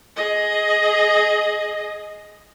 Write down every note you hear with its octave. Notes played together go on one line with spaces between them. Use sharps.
G#4 D#5